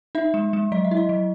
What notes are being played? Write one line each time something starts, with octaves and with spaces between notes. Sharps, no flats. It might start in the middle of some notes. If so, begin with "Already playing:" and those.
D#4 E5
G#3
G#3
F#3 D#5
E5
E4
D#5
F#3